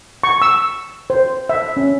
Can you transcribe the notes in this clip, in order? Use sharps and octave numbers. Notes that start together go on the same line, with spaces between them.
C#6
E6
C5
E5
C#4